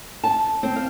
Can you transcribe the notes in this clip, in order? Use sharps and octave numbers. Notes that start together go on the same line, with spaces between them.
A5
C4
F5